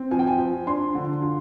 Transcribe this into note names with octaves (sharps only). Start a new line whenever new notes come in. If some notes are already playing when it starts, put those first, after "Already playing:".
Already playing: C4
F3 G#5
G5
G#5
F3
D4 C6
D3
F4